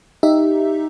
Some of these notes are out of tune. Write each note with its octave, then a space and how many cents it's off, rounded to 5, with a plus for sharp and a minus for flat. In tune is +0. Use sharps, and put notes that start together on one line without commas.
D#4 +0 G4 +0 E5 +0